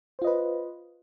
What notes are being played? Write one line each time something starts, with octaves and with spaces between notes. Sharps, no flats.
F4 B4 C5 D#5